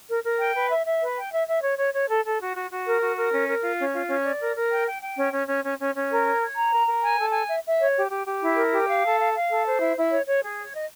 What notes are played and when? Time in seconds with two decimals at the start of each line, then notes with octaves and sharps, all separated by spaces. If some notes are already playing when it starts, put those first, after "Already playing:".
0.09 A#4
0.24 A#4
0.39 G5
0.55 B4
0.70 E5
0.86 E5
1.01 B4
1.17 G5
1.32 E5
1.48 E5
1.62 C#5
1.78 C#5
1.93 C#5
2.08 A4
2.25 A4
2.41 F#4
2.56 F#4
2.71 F#4
2.87 A#4
3.02 F#4
3.17 A#4
3.33 C#4
3.49 A#4
3.63 F4
3.79 C#4
3.94 F4
4.09 C#4
4.25 D5
4.40 A#4
4.56 A#4
4.72 G5
4.87 G5
5.02 G5
5.17 C#4
5.32 C#4
5.48 C#4
5.65 C#4
5.79 C#4
5.95 C#4
6.11 A#4
6.25 C#5
6.41 C#5
6.56 A#5
6.72 A#4
6.88 A#4
7.03 G#5
7.19 A4
7.33 G#5
7.49 E5
7.64 E5
7.80 C#5
7.96 G4
8.10 G4
8.26 G4
8.42 E4
8.56 A#4
8.73 G4
8.88 F5
9.03 A4
9.19 F5
9.34 F5
9.49 A4
9.65 C5
9.80 E4
9.96 E4
10.11 C#5
10.26 C#5
10.43 G#4
10.57 C#5
10.73 D#5